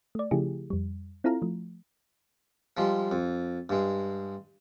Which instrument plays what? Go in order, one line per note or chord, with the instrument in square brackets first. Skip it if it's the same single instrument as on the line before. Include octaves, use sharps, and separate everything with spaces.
[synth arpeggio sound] A3 D5
C#3 F3 A3 E4 G4 G#4
F2 G3
C4 E4 F4 A4 F5 A#5
F3 A3
[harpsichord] F3 G3 G#3
F2
G2 G#3